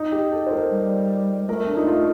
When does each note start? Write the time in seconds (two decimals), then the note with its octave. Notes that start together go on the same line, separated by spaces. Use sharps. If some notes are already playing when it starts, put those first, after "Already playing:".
Already playing: D#4
0.12 G4
0.32 A4
0.47 C5
0.51 A#4
0.71 G3
1.48 A3 A#4
1.67 D4
1.77 D#4
1.87 F4